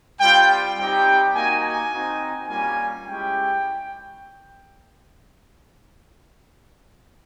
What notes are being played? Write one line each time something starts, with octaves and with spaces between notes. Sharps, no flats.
G3 C4 F4 G5
G3 C4 D#4 G4 G5
A#3 D#4 F#4 G#5
G#5
C4 D#4 F#4
G3 A#3 C#4 F4 G#5
G#3 C#4 E4 G4 G5